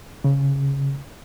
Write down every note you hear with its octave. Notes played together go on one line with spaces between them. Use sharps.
C#3